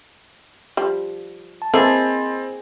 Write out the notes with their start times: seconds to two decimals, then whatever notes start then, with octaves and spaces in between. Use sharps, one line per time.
0.77 F3 G3
1.62 A5
1.74 E3 A#3 C4 G#4 A4 D#5 B5 A6